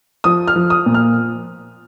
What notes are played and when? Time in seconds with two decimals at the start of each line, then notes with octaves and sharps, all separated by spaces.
0.24 F3 D#6
0.48 F6
0.56 F3
0.70 D#6
0.86 A#2
0.94 F6